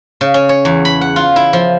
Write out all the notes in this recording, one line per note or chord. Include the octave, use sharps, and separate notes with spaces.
C#3
C#4
C#5
E2
B5
F#5
F4
E4
F3